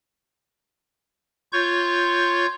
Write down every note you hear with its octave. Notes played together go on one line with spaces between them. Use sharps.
F4 C#5 C#6 G6